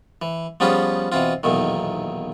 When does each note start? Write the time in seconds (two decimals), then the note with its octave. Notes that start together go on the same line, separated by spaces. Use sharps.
0.22 E3
0.60 F3 G3 B3 C#4 F4 G#4
1.12 B2 E3 C4 F4
1.43 B1 E2 A#2 D#3